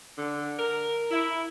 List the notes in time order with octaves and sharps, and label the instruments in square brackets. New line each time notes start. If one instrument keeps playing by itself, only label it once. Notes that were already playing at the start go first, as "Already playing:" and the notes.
[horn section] D3
A#4
E4